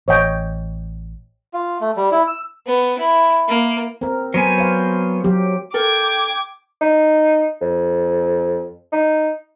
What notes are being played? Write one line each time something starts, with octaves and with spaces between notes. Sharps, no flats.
A1 C#5 D#5 G5
F4
A3
G3
E4
E6
B3
E4
A#3
C4 A#4
F#3 B3 C5 G#5
C5 F5
F#3 G4
A4 A#4 G5 D6 G#6
D#4
F2
D#4